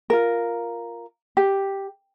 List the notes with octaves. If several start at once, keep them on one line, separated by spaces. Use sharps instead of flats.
F4 A#4
G4